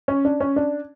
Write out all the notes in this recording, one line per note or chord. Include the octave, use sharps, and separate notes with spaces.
C#4
D4
C#4
D4